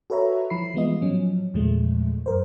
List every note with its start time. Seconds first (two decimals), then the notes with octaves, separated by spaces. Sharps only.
0.10 F#4 A4 B4 C#5 E5 A#5
0.50 F3 E4 B5 C7
0.74 E3 G3 G#3 B3 F4 D#5
1.02 A2 F3 F#3 C#4
1.54 E2 A#2 C#3 F3 G#3 A3
2.26 F#2 A#4 C5